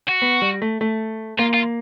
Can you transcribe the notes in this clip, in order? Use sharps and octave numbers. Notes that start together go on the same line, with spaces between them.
F#4
B3
G3
A3
A3
A#3 F4
F4